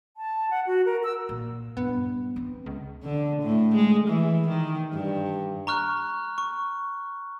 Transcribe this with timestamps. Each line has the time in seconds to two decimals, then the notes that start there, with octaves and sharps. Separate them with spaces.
0.17 A5
0.51 F#5
0.67 F#4
0.86 A#4
1.04 E6
1.29 A#2
1.77 G2 B3
2.36 C4
2.66 C#2
3.03 D3
3.42 A2
3.75 G#3
4.08 E3
4.48 D#3
4.93 G2
5.67 A#5 C#6 F6 F#6
6.38 C#6